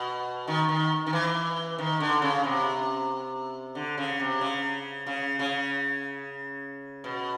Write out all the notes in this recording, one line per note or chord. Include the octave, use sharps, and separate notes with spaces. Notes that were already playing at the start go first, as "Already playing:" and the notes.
Already playing: B2
D#3
D#3
D#3
E3
D#3
D3
C#3
C3
D3
C#3
C3
C#3
C#3
C#3
B2